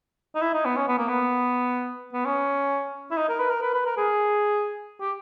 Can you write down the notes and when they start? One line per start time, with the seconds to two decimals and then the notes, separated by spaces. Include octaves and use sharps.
0.35 D#4
0.41 E4
0.54 D#4
0.65 B3
0.76 C#4
0.88 B3
0.98 A#3
1.08 B3
2.13 B3
2.25 C#4
3.11 E4
3.17 D#4
3.29 A#4
3.40 B4
3.51 A#4
3.62 B4
3.74 B4
3.86 A#4
3.97 G#4
5.01 G4